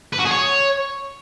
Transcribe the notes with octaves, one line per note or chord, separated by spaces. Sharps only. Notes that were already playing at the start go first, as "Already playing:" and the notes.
B4
F#4
G#4
C#5